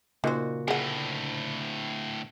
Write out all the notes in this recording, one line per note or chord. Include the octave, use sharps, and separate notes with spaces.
A#2 C#3 D#4 F#4 C5
D2 A2 G#4 F#5